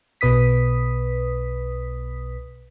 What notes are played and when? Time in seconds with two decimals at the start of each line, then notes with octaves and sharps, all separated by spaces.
0.21 B1 B2 B4 D#6 B6